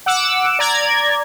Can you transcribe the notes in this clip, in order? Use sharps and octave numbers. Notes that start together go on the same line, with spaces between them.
F#5 D6 E6
D5 A#5 G#6